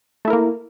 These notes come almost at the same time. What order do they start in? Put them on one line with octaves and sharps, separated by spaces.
A3 E4 A#4 A#3